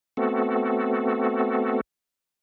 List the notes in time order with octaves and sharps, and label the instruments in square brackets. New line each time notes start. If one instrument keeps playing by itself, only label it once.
[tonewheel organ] A3 B3 C4 F#4 A4